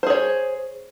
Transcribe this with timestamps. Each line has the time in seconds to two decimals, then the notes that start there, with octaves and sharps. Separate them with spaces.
0.03 C5
0.07 G#4
0.10 C#5